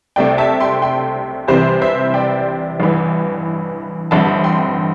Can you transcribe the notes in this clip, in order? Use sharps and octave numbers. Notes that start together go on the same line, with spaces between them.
C2 C3 A3 D5 G5
E5 A5
G5 C6
G5 C6
C2 C3 E3 G3 C4 G4 C5
C5 E5
D5 G5
A1 G2 E3
A1 G2 D3 C4 E5 A5
G5 C6